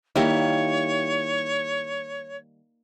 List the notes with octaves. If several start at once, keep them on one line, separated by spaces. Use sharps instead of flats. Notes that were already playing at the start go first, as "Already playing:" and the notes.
D#3 G3 A#3 E4 G4 C#5